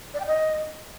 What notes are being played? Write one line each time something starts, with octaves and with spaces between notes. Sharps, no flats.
D5
G5
D#5